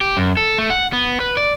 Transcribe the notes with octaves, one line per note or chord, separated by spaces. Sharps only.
G4
F#2
A4
A3
F#5
B3
B4
D5